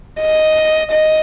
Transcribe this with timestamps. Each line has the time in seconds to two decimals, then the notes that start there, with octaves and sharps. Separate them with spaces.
0.21 D#5
0.91 D#5